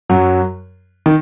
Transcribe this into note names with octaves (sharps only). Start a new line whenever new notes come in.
F#2 F#3
D#3